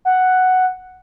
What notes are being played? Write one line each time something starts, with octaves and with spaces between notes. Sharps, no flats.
F#5